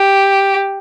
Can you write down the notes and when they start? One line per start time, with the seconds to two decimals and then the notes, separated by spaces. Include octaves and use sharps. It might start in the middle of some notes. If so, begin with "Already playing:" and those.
Already playing: G4